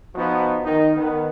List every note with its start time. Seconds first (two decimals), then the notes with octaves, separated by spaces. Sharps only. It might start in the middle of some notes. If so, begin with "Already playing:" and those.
0.15 F3 B3 D#4 F#4
0.64 D#3 D#4
0.97 D#3 B3